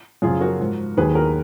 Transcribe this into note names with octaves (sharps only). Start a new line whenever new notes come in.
F#2 C#3 F3 F4 G#4
F#4 A#4
G#2 F3
D#2 D#3 F#3 G#4 B4
F#4 A#4